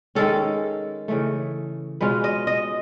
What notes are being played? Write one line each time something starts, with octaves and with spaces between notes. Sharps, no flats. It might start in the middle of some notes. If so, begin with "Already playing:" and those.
D#3 G#3 C#4 A4
C#3 E3 A3
B2 G#3 C#4 F4 B4
D#5
D#5